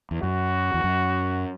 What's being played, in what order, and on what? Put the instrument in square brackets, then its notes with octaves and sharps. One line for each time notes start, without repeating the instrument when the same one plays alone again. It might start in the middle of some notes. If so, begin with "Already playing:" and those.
[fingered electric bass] E2
[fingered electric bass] F#2 [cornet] F#4
[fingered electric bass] E2
F#2